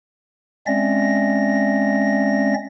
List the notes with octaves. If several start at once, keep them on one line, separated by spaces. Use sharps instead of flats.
G#3 C4 C#4 D5 E5 A#6